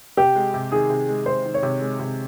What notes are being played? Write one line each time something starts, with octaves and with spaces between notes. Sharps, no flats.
C3 G4
G#3
C3
D#3 G#4
C3
G#3
C3 C5
D#3
C#5
C3
G#3
C3